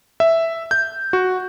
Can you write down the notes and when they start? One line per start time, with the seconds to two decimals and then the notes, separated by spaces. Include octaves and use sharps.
0.20 E5
0.71 G6
1.13 F#4